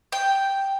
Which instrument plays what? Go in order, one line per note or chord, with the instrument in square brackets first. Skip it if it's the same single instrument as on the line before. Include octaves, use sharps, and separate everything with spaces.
[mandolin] G5